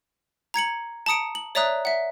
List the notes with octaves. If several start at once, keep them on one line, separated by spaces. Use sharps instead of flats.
A#5 G#6 C#7 F#7
A5 A#5 D#6 C#7 D7
F#7
C#5 D5 E5 A#5 D#6 F#6
E5 F#5